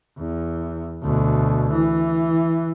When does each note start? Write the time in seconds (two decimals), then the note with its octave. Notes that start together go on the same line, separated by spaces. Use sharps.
0.18 E2
1.02 D2 B2
1.71 E3